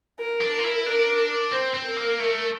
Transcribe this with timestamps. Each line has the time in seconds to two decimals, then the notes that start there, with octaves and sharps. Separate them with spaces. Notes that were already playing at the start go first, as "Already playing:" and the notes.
0.19 A#4
0.41 D4
0.52 A#4
0.59 F4
0.64 E4
0.85 D4 A#4
1.52 C4 C5
1.74 C4
1.85 A#4
1.97 A#3
2.20 A3